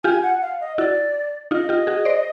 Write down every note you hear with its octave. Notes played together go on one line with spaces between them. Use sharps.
F4 G4 G#5
F#5
F5
D#5
E4 F#4 D5
D#4 F4 D#5
F4 G4
F#4 G#4
C5 D5